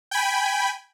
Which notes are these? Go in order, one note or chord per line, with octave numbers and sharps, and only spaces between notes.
G5 G#5 B5